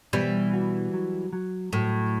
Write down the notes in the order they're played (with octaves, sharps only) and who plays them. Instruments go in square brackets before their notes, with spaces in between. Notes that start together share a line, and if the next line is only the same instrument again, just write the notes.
[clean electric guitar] B2 [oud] E3 G3
[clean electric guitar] F#4
F#3
F#3
[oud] A2 [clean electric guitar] F#3